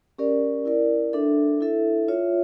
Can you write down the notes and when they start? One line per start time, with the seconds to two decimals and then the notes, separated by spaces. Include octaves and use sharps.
0.18 C#4 G4 A#4 D5
0.65 E4 A#4 D5
1.13 D4 A4 E5
1.61 E4 A4 E5
2.08 F4 C#5 E5